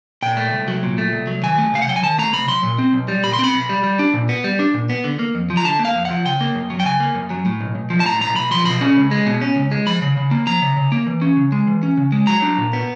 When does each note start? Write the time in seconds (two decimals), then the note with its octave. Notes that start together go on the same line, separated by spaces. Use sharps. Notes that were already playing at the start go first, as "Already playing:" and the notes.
0.22 A#2 G5
0.37 A3
0.53 C2
0.68 F#3
0.83 A#2
0.98 A3
1.12 C2
1.27 F#3
1.43 D#3 G#5
1.58 A3
1.73 C3 F5
1.82 F#5
1.88 F#3 G5
1.96 G#5
2.03 D#3 A5
2.18 A3 A#5
2.33 C3 B5
2.48 F#3 C6
2.63 A#2
2.78 C4
2.93 B1
3.08 G3
3.24 A#2 B5
3.33 C6
3.39 C4 B5
3.54 B1
3.69 G3
3.84 G3
3.99 D4
4.14 A#2
4.29 B3
4.44 G3
4.59 D4
4.74 A#2
4.89 B3
5.04 D3
5.19 A#3
5.35 F2
5.50 F3
5.57 A#5
5.65 D3 A5
5.79 A#3
5.85 F5
5.95 F2
6.05 F#5
6.10 F3
6.25 C#3 G5
6.41 A#3
6.55 F#2
6.70 F#3
6.80 G5
6.85 C#3 G#5
7.00 A#3
7.15 F#2
7.30 F#3
7.46 A2
7.61 B1
7.75 B1
7.90 F3
8.00 A5
8.06 A2 A#5
8.21 B1 A#5
8.35 B1 B5
8.51 F3 C6
8.65 B2 B5
8.81 C#4
8.96 C#2
9.11 G#3
9.26 B2
9.41 C#4
9.56 C#2
9.71 G#3
9.87 F3 B5
10.02 C#3
10.17 C#3
10.31 A#3
10.47 F3 A#5
10.62 C#3
10.77 C#3
10.92 A#3
11.07 E3
11.21 C#4
11.37 C#3
11.52 G#3
11.67 E3
11.83 C#4
11.97 C#3
12.12 G#3
12.27 F#3 A#5
12.42 D4
12.58 A#2
12.73 B3